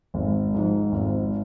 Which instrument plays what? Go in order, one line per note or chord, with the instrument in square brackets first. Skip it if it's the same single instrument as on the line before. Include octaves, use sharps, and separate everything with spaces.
[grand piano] G#1
G#2 F3
G#1